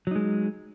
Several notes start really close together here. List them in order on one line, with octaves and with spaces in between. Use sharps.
F#3 D#4 G#3